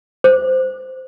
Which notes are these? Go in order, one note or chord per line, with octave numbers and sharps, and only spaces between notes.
C5